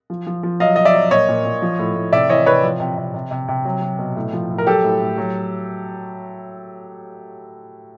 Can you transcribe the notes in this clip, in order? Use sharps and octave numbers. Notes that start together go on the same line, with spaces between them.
F3
F3
F3
F#3 D#5 F5
F#3 D#5
D5 E5
F#3
A#2 C#5 D#5
A#2
A#2
F3
A2
A2
C3 D5 E5
E3 C#5 D#5
C3 B4 C#5
F3
C3
C3
C3
C3
C3
F#3
F#3
B2
A2
F3
A2
A#4
F#3 G4 A4
A2
A2
F#3